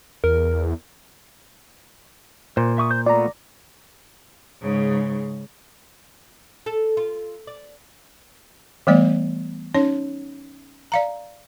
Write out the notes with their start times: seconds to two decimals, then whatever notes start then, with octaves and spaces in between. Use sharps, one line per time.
0.24 E2 A#4
2.57 A#2 C5
2.78 E5 C#6 D#6
2.91 C5 G6
3.06 A3 B3 F4 D5 A#5
4.62 G#2 C#3
6.66 A4
6.97 F4
7.47 D5
8.87 E3 G3 A3 B3 D5
9.75 C#4 D#4 C#5
10.92 D5 F5 A#5